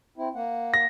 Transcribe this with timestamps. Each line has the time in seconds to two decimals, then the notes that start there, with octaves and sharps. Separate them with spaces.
0.18 C4 E4
0.35 A#3 F#5
0.74 A#6